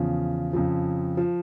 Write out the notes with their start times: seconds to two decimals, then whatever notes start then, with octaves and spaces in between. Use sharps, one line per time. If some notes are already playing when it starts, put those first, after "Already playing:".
Already playing: E2 C#3 F3
0.53 F2 C#3 F3
1.17 F3